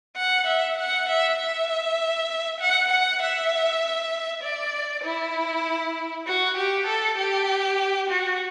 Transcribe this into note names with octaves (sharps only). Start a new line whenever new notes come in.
F#5
E5
F#5
E5
E5
F#5
F#5
E5
D5
E4
F#4
G4
A4
G4
F#4